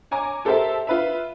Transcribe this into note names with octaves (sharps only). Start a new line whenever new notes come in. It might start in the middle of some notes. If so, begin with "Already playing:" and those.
C#5 G#5 A#5 D6
G4 A4 A#4 C5 E5 A5
F4 B4 E5